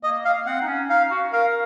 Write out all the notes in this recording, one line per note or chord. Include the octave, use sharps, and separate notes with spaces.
A#3 D#5
F5
C4 F#5
D#4
C#4
D#4 F5
F#4
A#4 F5